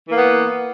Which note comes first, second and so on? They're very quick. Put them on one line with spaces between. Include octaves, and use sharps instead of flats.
E3 A#3 B3